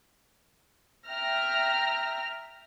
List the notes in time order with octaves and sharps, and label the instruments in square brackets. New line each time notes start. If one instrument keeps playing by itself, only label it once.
[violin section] E5 G5 A#5 F6 A#6